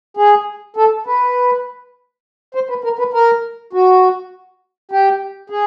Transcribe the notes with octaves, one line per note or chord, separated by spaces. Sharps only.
G#4
A4
B4
C5
B4
A#4
B4
A#4
F#4
G4
G#4